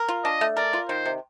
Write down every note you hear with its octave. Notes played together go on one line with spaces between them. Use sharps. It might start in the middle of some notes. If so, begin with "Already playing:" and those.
Already playing: A#4
F4
D4 D#5
A3
A#4 D5
F4
D#3 C5
C3